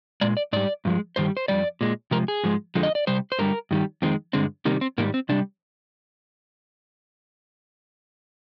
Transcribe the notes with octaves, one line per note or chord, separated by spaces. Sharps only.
A#2 G#3 D5
D5
G#2 G3 D5
G2 F3 G#3
G2 D#3 G3 C5
C5
F2 C3 G3 D5
A#2 G#3
C3 F3 G#3 A#4
G#4
G#2 F3 G#3
F2 D3 F3 G#3
D#5
D5
C3 G3 C5
C5
G2 D3 G3 A#4
G2 D#3 G3
F2 D#3 G#3 C4
G2 D3 G#3 C4
C3 D#3 G3 A#3
C4
G#2 D#3 G3 A#3
C4
C3 G3 D4